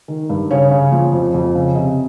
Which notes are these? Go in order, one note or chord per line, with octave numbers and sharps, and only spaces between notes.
D#3
G2
C#3 C#5
C#3
F3
F2
F2
C#3
C3 D#5